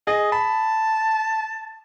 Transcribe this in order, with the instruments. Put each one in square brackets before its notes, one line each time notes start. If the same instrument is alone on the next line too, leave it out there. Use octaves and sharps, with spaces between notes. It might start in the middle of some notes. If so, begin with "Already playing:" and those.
[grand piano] G#4 [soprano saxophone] D#5
[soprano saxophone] A5 [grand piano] B5